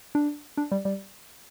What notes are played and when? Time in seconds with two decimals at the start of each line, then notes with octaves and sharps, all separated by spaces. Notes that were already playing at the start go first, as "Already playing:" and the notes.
0.15 D4
0.57 D4
0.72 G3
0.85 G3